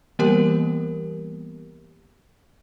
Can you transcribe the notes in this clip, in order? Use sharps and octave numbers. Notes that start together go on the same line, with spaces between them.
E3 G3 A#3 B3 G4 A#4